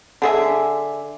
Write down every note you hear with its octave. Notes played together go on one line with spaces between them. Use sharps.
D3 G#4 E5